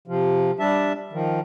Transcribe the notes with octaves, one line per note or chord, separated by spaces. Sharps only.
C3 F3
G3 D4 E5 A5
D#3 F3